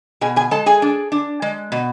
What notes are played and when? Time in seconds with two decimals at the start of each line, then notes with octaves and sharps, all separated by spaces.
0.21 B2 G#4 G#5
0.36 G#4 G#5
0.51 G#3 A4 A5
0.66 G#4 G#5
0.82 D4
1.12 D4
1.42 G#3
1.72 B2